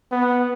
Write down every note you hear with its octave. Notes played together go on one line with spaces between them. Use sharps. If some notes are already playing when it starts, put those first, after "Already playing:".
B3